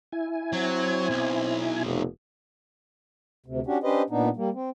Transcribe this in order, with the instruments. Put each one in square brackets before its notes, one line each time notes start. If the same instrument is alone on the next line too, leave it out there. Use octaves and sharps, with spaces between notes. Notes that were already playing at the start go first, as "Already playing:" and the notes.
[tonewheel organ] E4 G#5
[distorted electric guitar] F#3 [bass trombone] C4
[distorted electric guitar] B1
[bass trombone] F1
[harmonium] D2 C3
C#4 D4 F#4 G4
C#4 D4 G4 B4 C5 D#5
A#2 B3 D4 D#4
G3 A#3
C4